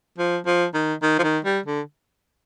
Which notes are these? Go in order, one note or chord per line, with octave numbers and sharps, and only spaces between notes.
F3
F3
D#3
D#3
F3
D#3
G3
D3